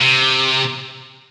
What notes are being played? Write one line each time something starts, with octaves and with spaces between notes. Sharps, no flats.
C3